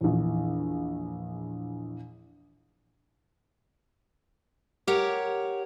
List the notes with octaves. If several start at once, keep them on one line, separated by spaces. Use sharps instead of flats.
A#1 E2
G4 A#4 C#5 F#5